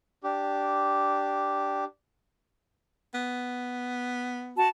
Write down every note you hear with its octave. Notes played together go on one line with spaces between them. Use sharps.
D4 G4
B3
F#4 A5